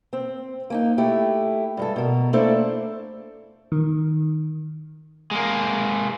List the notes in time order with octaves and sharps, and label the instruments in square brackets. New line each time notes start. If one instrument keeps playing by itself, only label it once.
[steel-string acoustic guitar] C4
A#3 C#4 D#4
A3 E4 G4
G2 G#3 A4
B2 A#4
A3 A#3 D4 E4 A4 C5
[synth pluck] D#3
[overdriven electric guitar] G#3 A#3